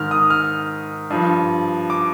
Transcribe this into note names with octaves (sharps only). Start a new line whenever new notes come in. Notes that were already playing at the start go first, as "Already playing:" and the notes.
Already playing: G#2 D#3 F6
D#6
F6
G2 F3
D6